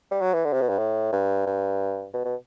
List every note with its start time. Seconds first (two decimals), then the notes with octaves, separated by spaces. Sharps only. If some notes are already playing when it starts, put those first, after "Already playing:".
0.11 G3
0.21 F#3
0.34 E3
0.45 D3
0.53 C3
0.61 B2
0.69 G2
0.78 A2
1.13 G2
1.46 G2
2.13 B2
2.25 B2